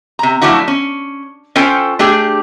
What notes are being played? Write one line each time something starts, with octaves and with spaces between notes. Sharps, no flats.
C3 A#5
F3 F#3 A3 D4 E4 F#4
C#4
C#4 F4 A4 C5 G5 G#5
A3 D4 G4 G#4